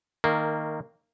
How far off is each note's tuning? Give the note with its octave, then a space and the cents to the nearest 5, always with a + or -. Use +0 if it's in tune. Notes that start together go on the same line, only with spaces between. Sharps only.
D#3 +0 A#3 -15